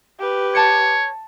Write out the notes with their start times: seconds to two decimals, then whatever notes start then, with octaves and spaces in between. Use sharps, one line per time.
0.19 G4 B4
0.55 C#5 A5 C#7